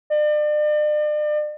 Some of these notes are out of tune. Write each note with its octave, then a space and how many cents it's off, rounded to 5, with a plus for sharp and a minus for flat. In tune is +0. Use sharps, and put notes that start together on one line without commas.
D5 +40